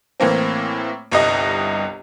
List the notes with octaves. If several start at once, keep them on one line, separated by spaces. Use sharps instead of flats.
A2 E3 A#3 C4
G1 C2 D#5